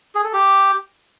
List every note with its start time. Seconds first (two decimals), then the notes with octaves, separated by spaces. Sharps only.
0.15 G#4
0.24 A4
0.33 G4